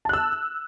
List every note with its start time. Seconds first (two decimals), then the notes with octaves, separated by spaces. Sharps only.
0.05 A5
0.09 F#6
0.13 E6